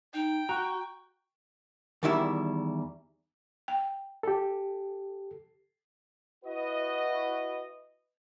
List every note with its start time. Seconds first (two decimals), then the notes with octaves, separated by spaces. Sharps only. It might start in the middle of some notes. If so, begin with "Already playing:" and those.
0.14 D#4 G5
0.49 F#4 A#5 C#6
2.03 E2 D#3 G3 E4 E5
3.68 G5
4.23 G4 A4
6.45 E4 F#4 B4 D#5